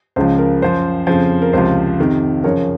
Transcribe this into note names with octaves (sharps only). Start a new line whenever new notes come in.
C#2 C#3 F3 C5
A#4
F#2 F3 C5
F2 C#3 F3 C5
A#4
C#2 C3 F3 C5
F2 C3 D#3
F#2 C#3 F3 A#4 C#5